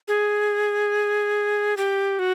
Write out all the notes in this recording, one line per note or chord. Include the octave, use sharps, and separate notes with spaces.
G#4
G4
F#4